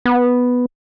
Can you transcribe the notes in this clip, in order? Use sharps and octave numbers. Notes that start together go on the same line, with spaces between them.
B3